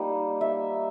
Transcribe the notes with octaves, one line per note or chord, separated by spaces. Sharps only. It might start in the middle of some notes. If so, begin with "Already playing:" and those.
Already playing: G3 A#3 D#4
E5